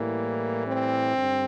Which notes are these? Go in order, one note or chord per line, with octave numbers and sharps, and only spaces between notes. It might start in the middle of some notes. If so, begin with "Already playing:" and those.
Already playing: A2 E3 G3 A#3
C4
G2 D3